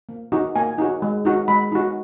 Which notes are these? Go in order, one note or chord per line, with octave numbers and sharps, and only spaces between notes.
A#3
D#4 F#4
A#3 G#5
D#4 F#4
G#3
D#4 F#4
G#3 B5
D#4 F#4